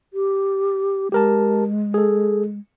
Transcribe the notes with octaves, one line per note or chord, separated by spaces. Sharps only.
G4
G#3 G4 A#4 A5
G#4 A4